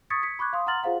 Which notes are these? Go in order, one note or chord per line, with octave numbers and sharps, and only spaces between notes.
C#6 D#6 G#6 A6 B6 C#7
G#6 B6 C#7
B5 C#6 D6 F#6 G#6
F5 C6 D#6
F#5 A#5 C6 F6 A6 F#7
F4 G#4 C5 F5 F#5